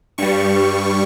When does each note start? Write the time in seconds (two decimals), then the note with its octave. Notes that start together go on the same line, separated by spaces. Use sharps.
0.18 G2 G3 C#6